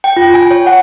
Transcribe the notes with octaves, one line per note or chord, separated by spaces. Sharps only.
G5
F4
G#5
C#5
F#5